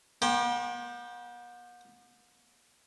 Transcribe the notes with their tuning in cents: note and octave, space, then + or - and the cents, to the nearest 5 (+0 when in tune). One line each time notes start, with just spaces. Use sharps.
B3 -45 G5 +0 C6 +40